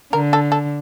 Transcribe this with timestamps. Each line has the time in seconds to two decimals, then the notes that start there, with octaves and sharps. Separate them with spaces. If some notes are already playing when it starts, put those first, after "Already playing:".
0.13 D3 A#4
0.33 A4
0.52 A4